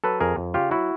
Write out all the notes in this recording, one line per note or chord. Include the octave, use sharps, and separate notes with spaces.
F#3 A4 B4
F2 G#4 A#4
F2
C#3 F4 G4
F#3 E4 F#4